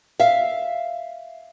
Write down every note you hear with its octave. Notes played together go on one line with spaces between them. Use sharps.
E5 F5